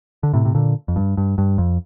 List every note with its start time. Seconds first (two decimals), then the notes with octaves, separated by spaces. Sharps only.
0.23 D3
0.33 A2 C3
0.45 C3
0.55 A#2 D3
0.88 F2
0.96 G2
1.17 G2
1.38 G2
1.58 F2